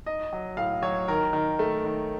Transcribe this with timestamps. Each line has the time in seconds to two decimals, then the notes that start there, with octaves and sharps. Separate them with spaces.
0.06 D#4 D#5
0.33 F#3
0.57 A2 F5
0.83 F#3 C#5
1.08 D#3 A#4
1.33 D#3
1.59 A3
1.85 D#3